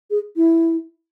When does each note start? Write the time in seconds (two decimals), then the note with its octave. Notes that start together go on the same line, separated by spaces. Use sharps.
0.11 G#4
0.36 E4